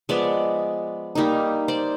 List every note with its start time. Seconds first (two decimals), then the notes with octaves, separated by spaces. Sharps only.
0.09 F3 G#3 B3 D5 E5
1.15 G3 A#3 D#4
1.68 C5 D5